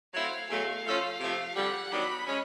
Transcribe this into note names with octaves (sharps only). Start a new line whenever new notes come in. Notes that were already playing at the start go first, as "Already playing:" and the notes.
F#3 A3 C4 E4 F5
E2 B2 F#3 A3 F5
F3 A3 C#4 F4 A4
C3 F3 A3
F2 D3 G3 F#5
D#3 F#3 B3 D4 G4 B5
G#3 C#4